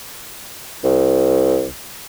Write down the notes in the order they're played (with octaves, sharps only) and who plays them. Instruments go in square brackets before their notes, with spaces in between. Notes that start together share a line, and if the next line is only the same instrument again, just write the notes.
[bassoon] C2